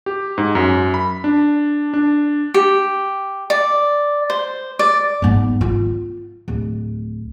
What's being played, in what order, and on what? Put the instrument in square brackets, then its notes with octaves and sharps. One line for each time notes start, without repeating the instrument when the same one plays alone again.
[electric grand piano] G4
G#2
F#2
B5
D4
D4
[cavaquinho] G4
D5
C5
D5
[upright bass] G#2 B3
F4
D1